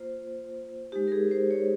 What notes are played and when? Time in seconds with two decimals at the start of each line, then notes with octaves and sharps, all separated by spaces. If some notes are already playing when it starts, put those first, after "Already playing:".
Already playing: A#3 F4 C5
0.92 G#3 D#4 G4
1.08 A#4
1.12 G#4
1.31 C5
1.51 C#5